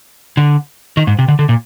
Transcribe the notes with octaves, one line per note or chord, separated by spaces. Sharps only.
D3
D#3
G#2
C3
D3
D3
A#2